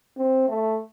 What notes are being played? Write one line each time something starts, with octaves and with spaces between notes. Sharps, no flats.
C4
A3